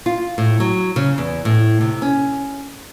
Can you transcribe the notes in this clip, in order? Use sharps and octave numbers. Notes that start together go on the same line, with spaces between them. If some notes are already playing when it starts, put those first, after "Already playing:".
F4
A2
F#3
C#3
E2
A2
C3
C#4